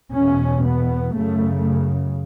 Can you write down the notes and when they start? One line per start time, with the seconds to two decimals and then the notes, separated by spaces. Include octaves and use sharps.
0.13 E2 B2 C#4
0.64 B3
1.14 F#2 C#3 A3